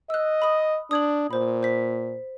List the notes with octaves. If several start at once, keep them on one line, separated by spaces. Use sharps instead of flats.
D#5 E6 F#6
B5 D#6
D4 D#6 G#6 F#7
A#2 C5 B5
C5 B6